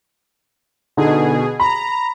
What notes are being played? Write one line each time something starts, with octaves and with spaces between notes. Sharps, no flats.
B2 D3 D#4 G#4
A#5 B5